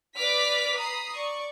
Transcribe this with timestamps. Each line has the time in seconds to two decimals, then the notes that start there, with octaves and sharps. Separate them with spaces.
0.16 B4 D5 D6 F6 B6
0.76 A#5 B5 D#6 C7
1.15 D5 C#6